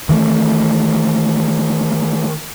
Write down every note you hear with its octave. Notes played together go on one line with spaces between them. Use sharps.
D#3 E3 G3 A3